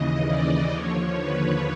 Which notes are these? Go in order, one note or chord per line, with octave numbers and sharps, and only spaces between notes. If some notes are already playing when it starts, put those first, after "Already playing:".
Already playing: D#2 C#3 E3 D#5
D5
D#2 D3 F3 C#5
B4